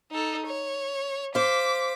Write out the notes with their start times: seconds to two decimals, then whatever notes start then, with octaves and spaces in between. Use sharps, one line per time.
0.11 D#4 A4
0.46 C#5
1.35 C5 F5 D6 B6